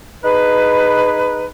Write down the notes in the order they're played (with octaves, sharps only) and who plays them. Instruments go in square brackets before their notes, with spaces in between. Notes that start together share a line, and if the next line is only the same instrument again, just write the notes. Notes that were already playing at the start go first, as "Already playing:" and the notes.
[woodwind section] D#4 G#4 B4